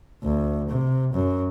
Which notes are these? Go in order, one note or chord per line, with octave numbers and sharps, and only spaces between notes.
D2
C3
F#2